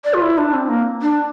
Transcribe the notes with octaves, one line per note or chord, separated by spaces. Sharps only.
D5
F4
E4
D4
C4
A#3
D4